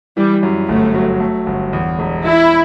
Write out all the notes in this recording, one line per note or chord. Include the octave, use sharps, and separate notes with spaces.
E3 G3
F#2
G1 A3
F#3
A3
G1
E2
E1
E3 E4